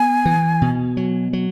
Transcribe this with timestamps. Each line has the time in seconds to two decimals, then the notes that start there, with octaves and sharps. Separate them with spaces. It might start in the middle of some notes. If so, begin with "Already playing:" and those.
Already playing: B3 G#5
0.25 E3
0.62 B2
0.97 F#3
1.33 F#3